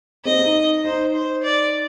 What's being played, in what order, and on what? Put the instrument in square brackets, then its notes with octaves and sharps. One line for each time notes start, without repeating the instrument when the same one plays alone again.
[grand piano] C4 [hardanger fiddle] D#5
[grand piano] D#4
[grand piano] D#4 [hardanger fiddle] C5
[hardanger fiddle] C5
D5